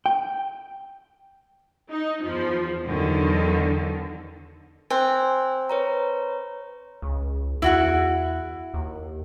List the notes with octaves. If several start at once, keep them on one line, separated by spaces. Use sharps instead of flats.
G5
D#4
E2 F3
E2 D3 D#3 F#3
C4 G#5 F#6
B4 C#5 A#5
C#2
E2 E4 F#4 F#5
D#2